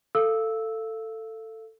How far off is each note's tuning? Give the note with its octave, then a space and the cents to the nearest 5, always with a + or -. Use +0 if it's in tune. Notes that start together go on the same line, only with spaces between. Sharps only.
A4 +15 F5 -25 E6 -10